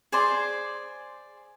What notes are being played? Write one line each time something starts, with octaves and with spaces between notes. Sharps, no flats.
G#4 C5 D5 C6